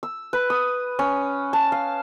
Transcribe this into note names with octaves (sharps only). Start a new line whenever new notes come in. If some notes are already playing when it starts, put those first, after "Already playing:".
E6
B4
D#6
C#4
A5
F5